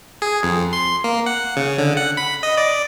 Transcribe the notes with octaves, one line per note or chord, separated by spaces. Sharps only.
G#4
F2
C6
A#3
F#5
C#3
D3
F#5
B5
D#5
D5